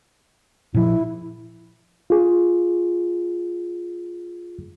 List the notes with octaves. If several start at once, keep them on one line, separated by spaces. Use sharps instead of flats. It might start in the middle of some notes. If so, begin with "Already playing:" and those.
A#2 F3 E4
F4 G#4